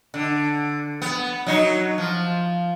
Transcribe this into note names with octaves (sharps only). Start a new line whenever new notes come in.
D3
B3
F#3 D#4
F3